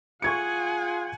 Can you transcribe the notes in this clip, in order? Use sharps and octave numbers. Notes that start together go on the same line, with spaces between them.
F4 G#4 F#5 G#5 C#6 G#6 C#7